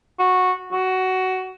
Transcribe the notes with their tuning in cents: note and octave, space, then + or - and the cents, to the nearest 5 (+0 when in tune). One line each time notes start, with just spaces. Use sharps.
F#4 -10
F#4 +15